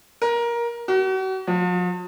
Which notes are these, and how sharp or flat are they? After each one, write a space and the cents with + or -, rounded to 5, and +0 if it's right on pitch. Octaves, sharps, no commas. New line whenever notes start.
A#4 +15
F#4 +40
F3 +45